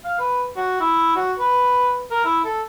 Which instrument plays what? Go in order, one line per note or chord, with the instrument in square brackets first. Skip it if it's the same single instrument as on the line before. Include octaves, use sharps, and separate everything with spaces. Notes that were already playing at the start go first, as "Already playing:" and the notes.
[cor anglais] F5
B4
F#4
E4
F#4
B4
A#4
E4
A4